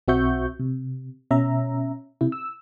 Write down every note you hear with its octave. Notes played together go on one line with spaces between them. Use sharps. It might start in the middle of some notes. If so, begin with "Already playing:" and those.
B1 C4 F#4 E5 C#6 G6
C3
B2 C#4 E5 A#5
C3 E4
E6